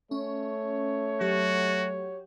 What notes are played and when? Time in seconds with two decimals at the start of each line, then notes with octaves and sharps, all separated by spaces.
0.11 A3 C#4 C#5
1.21 F#3 F#4 G4